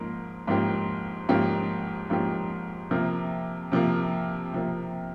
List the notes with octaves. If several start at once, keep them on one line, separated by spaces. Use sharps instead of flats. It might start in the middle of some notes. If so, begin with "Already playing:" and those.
Already playing: G#2 F3 A#3 C#4
G#2 F3 A#3 C#4 G4
G#2 F3 A#3 C#4 G4
G#2 F3 A#3 C#4 G4
C3 F3 A#3
C3 F3 A#3
C3 F3 A#3